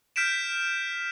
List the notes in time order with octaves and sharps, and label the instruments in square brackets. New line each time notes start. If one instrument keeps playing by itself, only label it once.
[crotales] F6 G6 B6 D7 E7